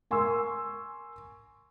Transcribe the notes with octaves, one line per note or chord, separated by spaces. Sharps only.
A#4 G#5 C6 C#6 E6